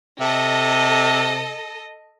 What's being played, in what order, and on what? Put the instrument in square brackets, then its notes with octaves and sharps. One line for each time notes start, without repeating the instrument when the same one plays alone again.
[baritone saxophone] C3 [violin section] A4 D#5